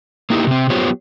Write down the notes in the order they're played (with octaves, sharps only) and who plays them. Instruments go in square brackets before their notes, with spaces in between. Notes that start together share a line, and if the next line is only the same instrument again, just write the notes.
[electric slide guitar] A#3 D#4 E4 G4
C3 C4
F#3 B3 F4 G4 C5 C#5